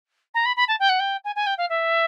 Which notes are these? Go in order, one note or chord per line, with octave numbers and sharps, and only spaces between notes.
A#5
B5
B5
A5
G5
F#5
G5
G#5
G#5
G5
F5
E5